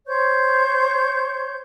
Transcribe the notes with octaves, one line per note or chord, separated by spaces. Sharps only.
C5 C#5 C#6 G6